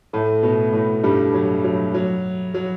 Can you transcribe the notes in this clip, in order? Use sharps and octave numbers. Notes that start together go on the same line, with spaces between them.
A2 A3
B2 B3
A2 A3
G2 G3
F#3
F#3
F#3
F#3